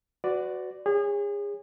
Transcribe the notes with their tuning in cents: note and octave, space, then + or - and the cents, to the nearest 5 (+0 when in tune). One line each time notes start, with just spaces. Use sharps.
F#4 +0 B4 +40 D5 +0
G#4 -35 C#5 +0